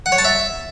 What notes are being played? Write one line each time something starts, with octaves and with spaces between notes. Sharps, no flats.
F#5
C#5
A5
E5